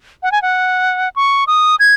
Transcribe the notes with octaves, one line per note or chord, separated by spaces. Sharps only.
F#5
G#5
F#5
C#6
D#6
G#6